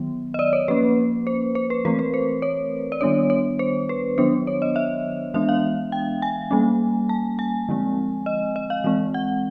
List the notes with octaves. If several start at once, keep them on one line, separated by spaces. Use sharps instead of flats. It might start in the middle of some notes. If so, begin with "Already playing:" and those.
Already playing: D#3 F#3 B3
D#5
D5
C#5
F3 A#3 C#4 B4
C5
C5
B4
E3 A3 C4 A#4
B4
C5
C#5
D5
D#3 G3 B3 D4 C#5
C#5
C5
B4
D#3 F#3 B3 D4 C5
C#5
D#5
E5
E3 G#3 B3 D4 E5
F5
G5
G#5
G3 A#3 C#4
A5
G#5
D3 F3 G#3 C4
D#5
D#5
F5
E3 G#3 C4
F#5